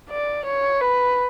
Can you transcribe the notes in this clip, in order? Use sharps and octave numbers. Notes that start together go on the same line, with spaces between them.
D5
C#5
B4